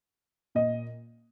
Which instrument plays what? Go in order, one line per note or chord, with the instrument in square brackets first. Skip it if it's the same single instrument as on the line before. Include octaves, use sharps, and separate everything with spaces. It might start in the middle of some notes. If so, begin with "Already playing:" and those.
[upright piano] A#2 D#5